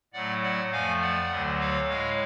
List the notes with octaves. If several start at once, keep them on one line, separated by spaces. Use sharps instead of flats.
A2 F#3 A3 D5 F#5
D5 F#5
F2 F3 A3 F5 G#5
D5 F#5
D2 D3 F#3 A3
C#5 F5
A2 G#3 C#5 F5